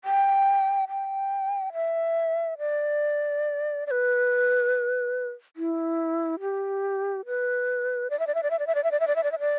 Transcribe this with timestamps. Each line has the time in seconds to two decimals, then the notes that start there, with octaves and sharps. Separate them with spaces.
0.04 G5
0.89 G5
1.73 E5
2.59 D5
3.87 D5
3.91 B4
5.56 E4
6.41 G4
7.26 B4
8.10 D5
8.19 E5
8.27 D5
8.35 E5
8.43 D5
8.51 E5
8.59 D5
8.67 E5
8.75 D5
8.84 E5
8.91 D5
9.00 E5
9.07 D5
9.16 E5
9.23 D5
9.32 E5
9.40 D5